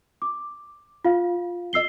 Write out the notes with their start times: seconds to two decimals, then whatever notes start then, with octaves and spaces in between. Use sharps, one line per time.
0.22 D6
1.05 F4 F5
1.73 D#5 E6 C7 G7